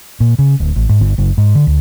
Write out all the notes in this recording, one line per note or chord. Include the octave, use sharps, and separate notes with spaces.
A#2
C#3
D1
A1
G#2
G1
F#1
G#2
D3
D2